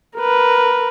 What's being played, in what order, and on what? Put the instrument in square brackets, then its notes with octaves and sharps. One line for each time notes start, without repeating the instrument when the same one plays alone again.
[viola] A#4 B4